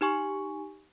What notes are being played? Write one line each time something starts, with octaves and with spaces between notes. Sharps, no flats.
D#4 G4 G#5 C#6